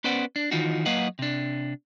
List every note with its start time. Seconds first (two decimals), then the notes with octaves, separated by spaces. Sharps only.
0.04 B3 C#4 B4 C5 D5 F#5
0.36 D4
0.51 D#3 E3 D#4 F4 F#4
0.86 F#3 A#3 B4 D#5 F5 F#5
1.19 C3 D4